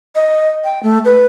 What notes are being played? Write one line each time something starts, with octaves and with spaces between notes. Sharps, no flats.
D#5
G5
A3
B4